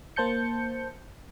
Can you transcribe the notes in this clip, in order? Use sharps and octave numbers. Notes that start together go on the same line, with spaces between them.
A#3 C5 A5 G6 C#7